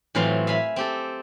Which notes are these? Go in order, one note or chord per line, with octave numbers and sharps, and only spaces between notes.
A2 E3 F#3 C4 F4 F5
E5 F5 G#5 B5
C4 G4 A4